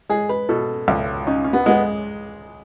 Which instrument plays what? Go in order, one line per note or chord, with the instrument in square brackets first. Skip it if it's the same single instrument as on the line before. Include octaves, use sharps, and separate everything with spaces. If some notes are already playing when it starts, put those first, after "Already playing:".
[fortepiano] G#3 [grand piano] G#4
[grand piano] B4
[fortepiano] B2 [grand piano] A4
[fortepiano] C#2
[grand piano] C#4 [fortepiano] D#4
[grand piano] C#4
B3
[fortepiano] G#3 [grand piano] B3